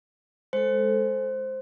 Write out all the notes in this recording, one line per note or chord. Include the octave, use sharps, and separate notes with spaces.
G#3 A4 C5